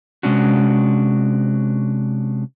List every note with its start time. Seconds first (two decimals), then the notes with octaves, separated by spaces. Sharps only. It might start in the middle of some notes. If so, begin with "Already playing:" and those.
0.23 C3 G#3 C#4 D4 F#4